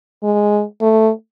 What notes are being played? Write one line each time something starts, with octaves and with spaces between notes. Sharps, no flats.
G#3
A3